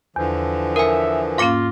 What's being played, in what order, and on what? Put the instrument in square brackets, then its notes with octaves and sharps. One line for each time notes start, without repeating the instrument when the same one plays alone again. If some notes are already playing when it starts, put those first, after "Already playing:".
[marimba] E2 [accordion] D3 E3 F3
[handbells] A#4 G#5 [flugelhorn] E5
[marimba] G#2 A#3 C#4 [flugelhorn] F4 [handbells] F5 D6